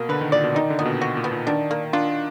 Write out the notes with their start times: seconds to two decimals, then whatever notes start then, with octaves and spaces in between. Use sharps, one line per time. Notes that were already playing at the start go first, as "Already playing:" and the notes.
Already playing: B2 A#3
0.09 D3 B4
0.21 D#3
0.32 A#2 D5
0.44 B2
0.55 D#3 D#4
0.70 D3
0.79 A#2 B3
0.85 B2
1.01 F#4
1.17 A#2
1.24 B3
1.32 A#2
1.47 D#3 D4
1.71 A#3
1.93 D4 F4